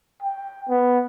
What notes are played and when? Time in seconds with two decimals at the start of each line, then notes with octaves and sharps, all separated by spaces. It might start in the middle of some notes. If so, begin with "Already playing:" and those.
0.22 G5
0.68 B3